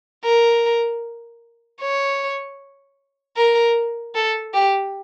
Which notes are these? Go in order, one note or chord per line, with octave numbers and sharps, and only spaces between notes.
A#4
C#5
A#4
A4
G4